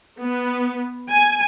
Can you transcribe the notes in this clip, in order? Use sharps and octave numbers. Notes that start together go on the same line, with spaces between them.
B3
G#5